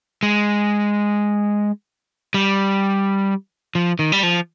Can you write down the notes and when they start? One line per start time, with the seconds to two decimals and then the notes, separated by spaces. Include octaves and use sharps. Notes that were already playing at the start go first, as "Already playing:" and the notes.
0.23 G#3
2.34 G3
3.75 F3
3.99 D#3
4.12 G3
4.23 F3